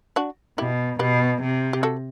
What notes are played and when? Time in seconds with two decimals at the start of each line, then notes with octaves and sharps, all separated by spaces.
0.16 D4 F#4
0.58 B2 E4 G4
0.99 B2 G4 B4
1.42 C3
1.73 G4
1.83 F#4 A4